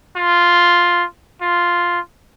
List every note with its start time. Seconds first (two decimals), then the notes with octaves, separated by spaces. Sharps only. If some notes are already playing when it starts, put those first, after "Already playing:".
0.16 F4
1.42 F4